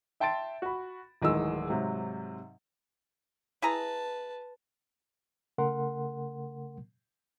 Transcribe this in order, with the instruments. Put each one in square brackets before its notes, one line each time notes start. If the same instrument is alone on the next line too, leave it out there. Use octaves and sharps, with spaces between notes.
[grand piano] E5 G5 A5 C6 A6 D7
F#4 B5
D1 D#3 E3 G#3 E6
G#2 C3 F#3
[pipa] E4 G#4 A#5 [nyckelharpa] B4 A5
[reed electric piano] C#3 A3 A#4 F#5 C6